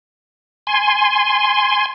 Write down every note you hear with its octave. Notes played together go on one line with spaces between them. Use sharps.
G#5 C6